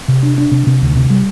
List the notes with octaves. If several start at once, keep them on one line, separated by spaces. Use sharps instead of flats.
C3
D4
D4
C3
C3
D2
C3
G3